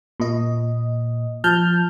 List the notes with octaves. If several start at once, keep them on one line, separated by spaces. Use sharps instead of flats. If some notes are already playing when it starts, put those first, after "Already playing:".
A#2 D#5
F3 A5 F6 G6